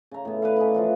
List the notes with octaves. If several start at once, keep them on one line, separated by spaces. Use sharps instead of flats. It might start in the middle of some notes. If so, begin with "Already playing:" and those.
C#3 A#5
A2 B3
B4 D5 F5
C#4 D#4 B4
E3 F3 F4